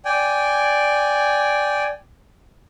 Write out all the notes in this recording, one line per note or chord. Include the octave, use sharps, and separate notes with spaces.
D5 G5 G#5